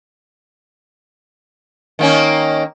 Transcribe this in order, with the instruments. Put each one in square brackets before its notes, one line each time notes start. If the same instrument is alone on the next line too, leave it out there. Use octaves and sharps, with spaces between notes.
[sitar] D#3 A#3 C#4